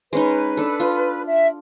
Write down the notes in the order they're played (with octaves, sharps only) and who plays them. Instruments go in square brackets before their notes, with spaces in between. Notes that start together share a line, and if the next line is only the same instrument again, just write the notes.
[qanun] G#3 C#4 D#4 [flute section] B4
[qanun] D4 A4
F4
[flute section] E5